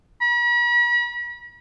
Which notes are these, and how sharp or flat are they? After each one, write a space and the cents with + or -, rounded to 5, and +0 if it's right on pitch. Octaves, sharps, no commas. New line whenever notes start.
B5 -45